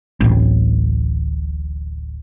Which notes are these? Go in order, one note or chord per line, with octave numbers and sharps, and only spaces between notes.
D1 A1